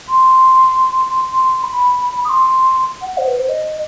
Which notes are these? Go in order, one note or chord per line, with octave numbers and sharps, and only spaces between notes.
C6
C6
B5
D#6
C6
F#5
C5
B4
C5
D#5